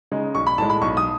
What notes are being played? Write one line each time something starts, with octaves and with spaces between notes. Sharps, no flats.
C#3 G#3 D#4
B1 C#6
B5
A2 G#3 A5
B5
B1 C#6
D#6